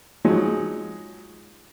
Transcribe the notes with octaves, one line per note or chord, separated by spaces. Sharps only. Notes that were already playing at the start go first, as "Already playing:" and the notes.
F3 F#3 G#3 D#4